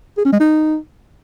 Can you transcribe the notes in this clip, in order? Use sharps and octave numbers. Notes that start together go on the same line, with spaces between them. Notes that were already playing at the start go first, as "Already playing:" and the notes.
G#4
C#4
G#3
D#4